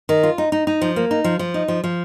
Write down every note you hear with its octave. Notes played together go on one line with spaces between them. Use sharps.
D#3
F4
D#4
D#4
D#4
F3
A#3
D#4
F3
F3
D#4
F3
F3